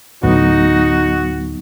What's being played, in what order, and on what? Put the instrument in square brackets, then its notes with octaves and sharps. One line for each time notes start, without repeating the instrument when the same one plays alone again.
[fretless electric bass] D2 A2 [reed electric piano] F#3 B3 [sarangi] D#4 [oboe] F#4